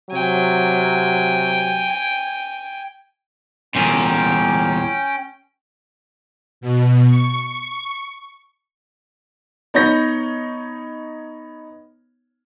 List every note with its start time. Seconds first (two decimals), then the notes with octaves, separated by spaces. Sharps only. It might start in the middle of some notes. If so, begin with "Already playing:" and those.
0.11 C3 F#3 G5 G#5
3.75 E2 A#2 C#4 G5
6.61 B2
7.07 C#6
9.74 B3 D#4 C#5 G6 A#6